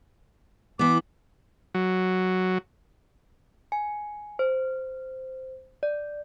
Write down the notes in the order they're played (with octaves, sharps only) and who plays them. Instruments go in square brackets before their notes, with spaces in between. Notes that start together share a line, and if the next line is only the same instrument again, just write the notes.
[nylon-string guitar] E3 B3 [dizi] D6
[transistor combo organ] F#3
[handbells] G#5
C5
D5